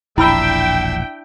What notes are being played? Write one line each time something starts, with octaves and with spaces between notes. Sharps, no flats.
E1 A#1 D4 E4 E5 G5 B5 E6